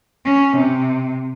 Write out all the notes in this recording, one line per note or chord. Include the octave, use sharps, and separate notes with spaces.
C#4
C3